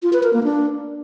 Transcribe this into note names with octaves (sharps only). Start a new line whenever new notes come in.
F4
B4
A#4
A#3
D4